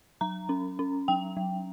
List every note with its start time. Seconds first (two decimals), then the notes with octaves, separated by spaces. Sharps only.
0.21 F#3 A#5
0.49 C#4
0.79 C#4
1.08 F#3 G5
1.37 F#3